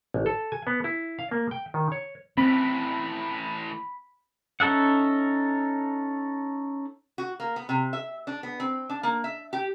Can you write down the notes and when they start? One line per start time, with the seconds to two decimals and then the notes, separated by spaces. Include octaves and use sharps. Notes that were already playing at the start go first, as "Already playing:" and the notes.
0.14 A1
0.26 A4
0.52 G#5
0.67 B3
0.84 E4
1.19 F5
1.31 A#3
1.51 G5
1.74 D#3
1.92 C#5
2.37 A2 E3 C4 B5
4.60 C#4 D#4 A4 E5 F#5
7.18 F#4
7.40 A#3
7.56 B3
7.69 C3
7.93 E5
8.27 D4
8.43 B3
8.60 C4
8.90 D4
9.03 A#3
9.24 E5
9.53 G4